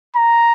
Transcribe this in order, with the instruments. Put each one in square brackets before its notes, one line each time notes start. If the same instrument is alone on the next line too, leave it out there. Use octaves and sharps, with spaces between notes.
[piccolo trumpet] A#5